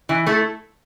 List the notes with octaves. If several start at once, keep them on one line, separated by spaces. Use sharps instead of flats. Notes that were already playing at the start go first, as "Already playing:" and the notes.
E3
A3 E4 A4